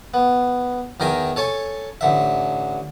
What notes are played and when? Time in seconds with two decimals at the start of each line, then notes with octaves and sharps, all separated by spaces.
0.14 B3
1.00 E2 D#3 A#4 G5 G#5 D#6
1.36 A4 C#5 G#5 A5
2.01 A1 D3 E5